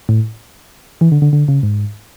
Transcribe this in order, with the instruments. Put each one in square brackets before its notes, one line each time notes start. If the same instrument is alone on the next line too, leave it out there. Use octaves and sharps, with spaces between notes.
[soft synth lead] A2
E3
D3
D3
D3
C#3
G#2